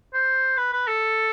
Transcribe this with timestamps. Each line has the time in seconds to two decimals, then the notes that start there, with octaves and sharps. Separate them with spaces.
0.14 C5
0.57 B4
0.73 B4
0.87 A4